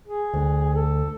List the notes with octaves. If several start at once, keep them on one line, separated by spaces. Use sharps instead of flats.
G#4
D2
A4